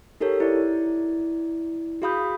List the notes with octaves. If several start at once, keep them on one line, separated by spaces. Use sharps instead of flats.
D#4 G4 A4 A#4 C#5
E4 D5
F#4 G#4 F5 B5 D#6 G6